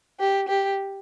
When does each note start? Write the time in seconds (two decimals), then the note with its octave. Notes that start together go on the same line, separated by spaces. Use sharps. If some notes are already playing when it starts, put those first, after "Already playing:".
0.20 G4
0.49 G4